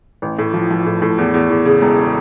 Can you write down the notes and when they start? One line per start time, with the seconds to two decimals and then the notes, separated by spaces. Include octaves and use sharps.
0.22 A1
0.38 A2
0.54 F3
0.70 F3
0.86 A2
1.02 A2
1.18 E2
1.34 E2
1.50 E2
1.65 C#3
1.82 E1